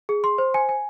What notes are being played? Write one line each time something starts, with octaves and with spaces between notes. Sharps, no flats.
G#4
C6
C5
G#5
G#5